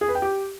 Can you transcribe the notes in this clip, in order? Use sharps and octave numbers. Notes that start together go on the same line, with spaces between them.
G#4
B4
G5
G4